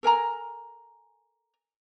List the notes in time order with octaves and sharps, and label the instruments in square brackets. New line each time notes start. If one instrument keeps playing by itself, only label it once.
[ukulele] A4 A#4 G#5 A#5